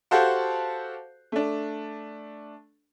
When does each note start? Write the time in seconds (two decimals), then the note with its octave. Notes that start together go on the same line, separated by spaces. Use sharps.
0.11 F#4 G4 A4 C5 F5 F#5
1.32 A3 D4